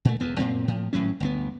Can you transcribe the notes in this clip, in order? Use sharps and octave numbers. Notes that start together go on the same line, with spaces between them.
A#2 A3
E1 E2 B3
F#2 A#2 C4
A2 F3
G#1 A2 F#3 C#4
G1 D2 B3